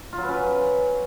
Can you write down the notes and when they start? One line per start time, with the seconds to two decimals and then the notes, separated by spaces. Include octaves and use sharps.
0.12 F4
0.18 F#3
0.23 B4
0.28 C#4
0.33 B4